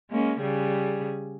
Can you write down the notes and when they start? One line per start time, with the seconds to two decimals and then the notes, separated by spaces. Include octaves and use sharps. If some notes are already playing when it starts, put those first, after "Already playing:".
0.11 G#3 A#3 C#4
0.41 C#3 G3 G#4